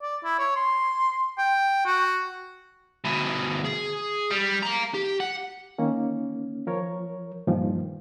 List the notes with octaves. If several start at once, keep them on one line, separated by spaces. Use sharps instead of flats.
D5
E4
C#5
C6
G5
F#4
D2 B2
G#4
G3
F5 A#5
G4
F#5
D#3 A#3 C#4
F3 A#4 C#5
G2 A#2 D#3 F3